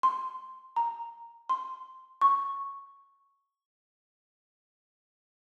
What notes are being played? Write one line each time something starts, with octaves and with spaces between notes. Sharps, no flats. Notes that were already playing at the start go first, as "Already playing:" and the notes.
C6
A#5
C6
C#6